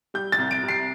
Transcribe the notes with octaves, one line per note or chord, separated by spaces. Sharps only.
G3 G6
A6
C2
D7
C3
C7